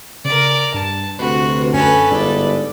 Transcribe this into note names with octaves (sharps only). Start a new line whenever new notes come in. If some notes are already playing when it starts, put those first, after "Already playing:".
C#3 A#4 D5
G2 A5
D2 C3 F#4 B4
F#2 C#4 A4 B4
G1 G#2 D5